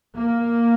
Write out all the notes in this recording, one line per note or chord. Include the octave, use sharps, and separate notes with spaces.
A#3